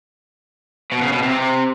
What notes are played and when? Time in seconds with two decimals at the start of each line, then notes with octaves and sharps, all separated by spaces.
0.92 B2
1.02 C#3
1.12 B2
1.22 C3
1.33 C3